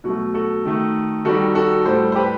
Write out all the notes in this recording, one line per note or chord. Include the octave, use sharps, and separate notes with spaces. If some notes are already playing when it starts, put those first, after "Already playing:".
B2 F#3 A3 F#4
F#4 A4
D#3 A3
D#3 G3 F#4 A4
F#4 A4
A2 G3 A4 C5
C5
G4 B4